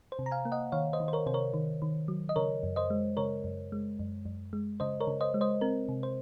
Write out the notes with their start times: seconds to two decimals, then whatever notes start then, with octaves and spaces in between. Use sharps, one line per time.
0.12 C5
0.19 C3
0.26 A#5
0.31 F5 G#5
0.45 A#3
0.52 D#5 F#5
0.72 D#3 C#5 F5
0.93 C5 D#5
1.00 D#3
1.08 C5
1.13 A#4 C#5
1.26 C3 C5
1.34 A#4 C#5
1.54 D#3
1.82 D#3
2.08 F#3
2.29 D#5
2.36 C#3 A#4 C#5
2.63 F#2
2.76 C5 D#5
2.90 G#3
3.17 C#3 A#4 C#5
3.44 F#2
3.72 G#3
3.99 F#2
4.25 F#2
4.53 G#3
4.80 C#3 C5 D#5
5.00 A#4 C#5
5.07 C#3
5.21 C5 D#5
5.34 G#3
5.41 C5 D#5
5.61 C4 A#4
5.89 C3
6.03 C5